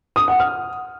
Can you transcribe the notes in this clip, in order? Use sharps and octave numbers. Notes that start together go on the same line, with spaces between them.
D#6
F#5
F6